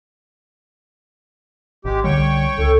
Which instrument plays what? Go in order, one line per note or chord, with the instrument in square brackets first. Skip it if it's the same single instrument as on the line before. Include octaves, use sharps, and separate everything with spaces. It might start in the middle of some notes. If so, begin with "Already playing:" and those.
[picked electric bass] G#1 [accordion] G#3 G4
[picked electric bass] C2 D3 G3 [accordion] C#5 G5 C#6
[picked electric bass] C#2 [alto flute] A4